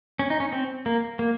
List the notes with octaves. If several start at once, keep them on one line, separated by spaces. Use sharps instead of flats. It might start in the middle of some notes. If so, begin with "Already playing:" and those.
C#4
D#4
C#4
C4
A#3
A#3